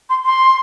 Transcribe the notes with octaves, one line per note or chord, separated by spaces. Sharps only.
C6
C6